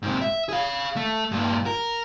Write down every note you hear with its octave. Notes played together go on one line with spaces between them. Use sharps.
G#2 C3
E5
G#4 F5
A3
G2 A#2
A#4